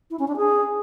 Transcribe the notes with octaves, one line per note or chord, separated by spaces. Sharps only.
E4
C#4
D4
G#4